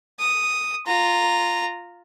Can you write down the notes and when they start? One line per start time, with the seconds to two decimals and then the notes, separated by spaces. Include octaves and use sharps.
0.19 D#6
0.87 F4 A#5